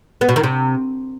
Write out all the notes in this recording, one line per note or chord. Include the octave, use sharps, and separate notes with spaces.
B3
B2
D#3
C3